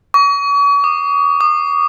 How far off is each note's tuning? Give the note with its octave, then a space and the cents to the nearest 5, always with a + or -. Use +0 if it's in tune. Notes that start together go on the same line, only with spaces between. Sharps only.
C#6 +40
D#6 -40
D#6 -40